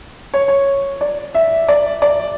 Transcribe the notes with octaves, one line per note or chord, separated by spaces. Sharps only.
C#5
C#5
D5
E5
D5
D5